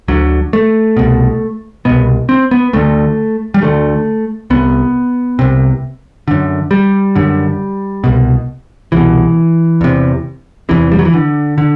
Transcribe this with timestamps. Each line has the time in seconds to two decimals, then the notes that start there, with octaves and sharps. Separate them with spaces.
0.08 D2 D3 F#3
0.53 A3
0.97 C2 B2
1.85 C2 B2 B3
2.29 C4
2.51 B3
2.73 D2 D3 A3
3.54 G3
3.62 D2 D3 A3
4.50 C2 C3 B3
5.39 C2 C3
6.28 F#2 D3
6.71 G3
7.16 F#2 D3
8.04 C2 B2
8.92 C2 B2 E3
9.81 E2 C3
10.69 E2 C3 E3
10.92 G3
10.99 F#3
11.05 E3
11.14 D3
11.58 D3